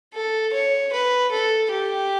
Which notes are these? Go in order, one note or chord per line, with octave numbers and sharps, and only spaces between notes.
A4
C#5
B4
A4
G4